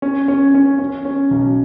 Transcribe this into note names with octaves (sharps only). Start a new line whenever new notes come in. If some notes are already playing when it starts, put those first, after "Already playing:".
C#4
C#4
C#4
C#4
C#4
B1